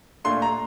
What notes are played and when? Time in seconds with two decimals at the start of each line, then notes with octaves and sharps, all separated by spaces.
0.24 A#2 A3 D4 F4 C6
0.42 A#5